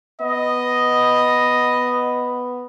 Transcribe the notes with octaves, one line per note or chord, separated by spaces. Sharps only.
B3 D#5